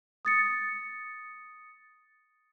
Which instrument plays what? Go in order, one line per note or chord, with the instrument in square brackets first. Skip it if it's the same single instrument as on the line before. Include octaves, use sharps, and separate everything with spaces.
[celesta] D#6 A6 C#7